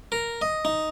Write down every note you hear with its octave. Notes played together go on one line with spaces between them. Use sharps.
A#4
D#5
D#4